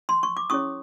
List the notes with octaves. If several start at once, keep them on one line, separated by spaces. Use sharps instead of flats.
C6
C#6
D6
C#4 E4 G#4 C#5 C#6 D#6